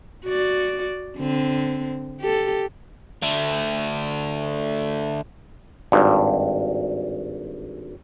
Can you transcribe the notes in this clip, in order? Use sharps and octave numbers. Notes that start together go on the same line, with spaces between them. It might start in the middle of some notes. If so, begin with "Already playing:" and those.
F#4 D5
D3 C4
G4 A4
D3 A3
G#1 G2